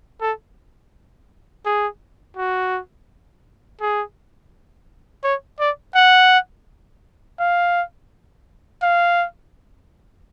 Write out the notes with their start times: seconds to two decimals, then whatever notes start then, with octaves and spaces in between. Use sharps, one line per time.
0.21 A4
1.66 G#4
2.37 F#4
3.81 G#4
5.24 C#5
5.60 D5
5.95 F#5
7.39 F5
8.83 F5